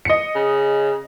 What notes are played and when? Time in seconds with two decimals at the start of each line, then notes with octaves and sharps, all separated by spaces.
0.05 D#5 C#7
0.35 C#3